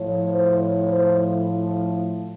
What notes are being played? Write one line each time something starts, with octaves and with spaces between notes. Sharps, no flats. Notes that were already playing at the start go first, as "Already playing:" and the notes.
Already playing: A2 F3 C#5
C5
C#5
C5